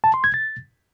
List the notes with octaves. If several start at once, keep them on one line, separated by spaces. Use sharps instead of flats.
A5
C6
G#6
A6